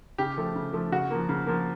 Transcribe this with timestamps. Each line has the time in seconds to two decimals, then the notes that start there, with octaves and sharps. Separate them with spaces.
0.18 C#3 G4
0.37 F3 A3
0.55 C#3
0.73 F3 A3
0.92 C#3 F#4
1.11 F3 A#3
1.29 C#3
1.47 F3 A#3